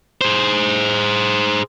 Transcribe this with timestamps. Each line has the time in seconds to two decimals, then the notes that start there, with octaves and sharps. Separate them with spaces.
0.21 G#4 C5